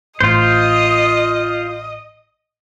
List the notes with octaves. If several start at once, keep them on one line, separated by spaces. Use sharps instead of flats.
A1 A2 F4 C5 D#5